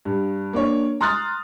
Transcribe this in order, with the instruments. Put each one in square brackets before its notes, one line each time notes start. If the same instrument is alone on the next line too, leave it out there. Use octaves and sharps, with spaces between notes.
[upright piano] G2
A#3 D4 C#5
A#5 C6 D#6 F6 F#6 A6